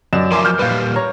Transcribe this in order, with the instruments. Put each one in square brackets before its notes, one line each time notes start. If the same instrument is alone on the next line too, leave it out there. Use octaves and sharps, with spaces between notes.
[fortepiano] F#2 D5 [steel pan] D#5 [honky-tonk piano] E7
[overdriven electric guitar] F3 F#3 [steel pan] A#4 [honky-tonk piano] E5 G#5 [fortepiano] C6 D6
[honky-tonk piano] F6 G6
[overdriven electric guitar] A#2 G3 [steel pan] B4 F5
[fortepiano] C#5 [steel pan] A#5